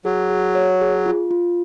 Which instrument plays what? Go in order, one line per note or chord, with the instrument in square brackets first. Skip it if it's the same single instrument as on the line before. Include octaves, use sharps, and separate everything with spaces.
[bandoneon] F#3 [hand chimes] G#4
[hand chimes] G#4
C#5
G#4
F4
F4